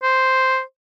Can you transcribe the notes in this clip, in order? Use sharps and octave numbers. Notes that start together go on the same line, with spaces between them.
C5